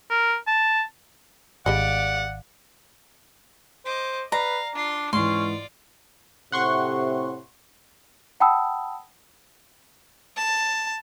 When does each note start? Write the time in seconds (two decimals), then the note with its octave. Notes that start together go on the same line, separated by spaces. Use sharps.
0.10 A#4
0.47 A5
1.66 G#1 D3 G3 G#3 D5 F5 F#5
3.86 C5 D#5 D6
4.32 B4 D5 F5 A#5
4.75 D4 F4 C6
5.13 G#2 E3 C#4 F4 D5 C6
6.52 A2 C3 F#5 C6 C#6
8.40 F#5 G5 A5 B5 D#6 E6
10.37 A5